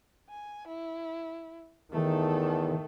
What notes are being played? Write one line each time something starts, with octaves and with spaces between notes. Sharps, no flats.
G#5
E4
E2 D#3 A3 A4